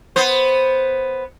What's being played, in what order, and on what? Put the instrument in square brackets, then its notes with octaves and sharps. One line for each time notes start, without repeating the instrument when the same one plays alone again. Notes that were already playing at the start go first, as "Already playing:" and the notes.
[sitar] B3 C5